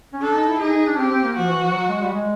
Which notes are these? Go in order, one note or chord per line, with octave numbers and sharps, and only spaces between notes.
C#4
D4 A4
D#4
E4
D#4 G#4
D#4
D4
C4 G4
C4
A#3
F3 F#4
E3
F3
F#3
G#3
G3
G#3